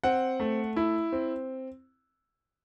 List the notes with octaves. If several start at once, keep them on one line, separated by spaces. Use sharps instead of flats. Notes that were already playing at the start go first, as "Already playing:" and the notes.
C4 F#5
A3
E4
C4